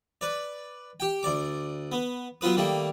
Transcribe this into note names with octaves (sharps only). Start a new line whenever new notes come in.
B4 D5
G4 G5
D2 D5 D6
B3
F#3 B3 F4 B4 D#6
D#3 G3 A3 A#3